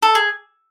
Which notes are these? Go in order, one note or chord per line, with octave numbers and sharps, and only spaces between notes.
A4
G#4